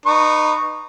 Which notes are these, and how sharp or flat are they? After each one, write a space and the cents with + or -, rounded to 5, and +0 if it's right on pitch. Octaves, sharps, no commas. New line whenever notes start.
D#4 -25 B4 +0 C#6 +0